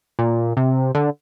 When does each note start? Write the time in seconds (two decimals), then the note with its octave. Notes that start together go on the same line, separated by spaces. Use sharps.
0.19 A#2
0.57 C3
0.95 D3